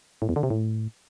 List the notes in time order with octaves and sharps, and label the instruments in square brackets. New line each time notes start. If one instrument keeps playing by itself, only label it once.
[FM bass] A2
E2
D3
C3
A2